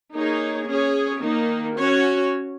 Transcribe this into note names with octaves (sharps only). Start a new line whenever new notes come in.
A#3 D#4 G#4 C#5
C#4 G#4 C#5
D#3 A#3 D#4
C#4 F#4 C#5